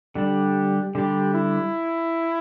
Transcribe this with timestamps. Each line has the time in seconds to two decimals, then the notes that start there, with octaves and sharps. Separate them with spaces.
0.15 D3 G3 D4 G4
0.94 D3 G3 D4 G4
1.34 E4